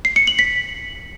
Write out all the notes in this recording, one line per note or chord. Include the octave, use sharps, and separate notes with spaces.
C7
C#7
F#7
B6